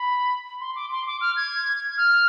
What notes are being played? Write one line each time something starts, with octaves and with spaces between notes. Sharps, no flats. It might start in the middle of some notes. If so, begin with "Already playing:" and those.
Already playing: B5
C6
D6
C6
D6
F6
G#6
F6